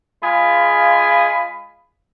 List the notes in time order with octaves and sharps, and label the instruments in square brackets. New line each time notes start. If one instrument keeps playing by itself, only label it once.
[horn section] G#3 F4 G#4 F5 B5